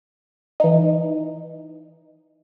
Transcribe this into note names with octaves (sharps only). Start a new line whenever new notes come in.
E3 D#4